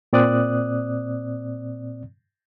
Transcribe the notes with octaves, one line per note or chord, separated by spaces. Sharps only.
A#2 C4 D5 D#6 F#6